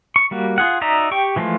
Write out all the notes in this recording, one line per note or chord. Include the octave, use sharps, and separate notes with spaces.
C#6
G3 A#3 F#4
F4 G#4 F#5
D#4 F#4 D5 E5 A#5
G4 G5 C#6
E3 F3 G#3 A3 F4